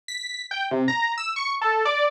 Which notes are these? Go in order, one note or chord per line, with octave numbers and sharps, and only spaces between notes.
B6
G5
C3
A#5
E6
C#6
A4
D5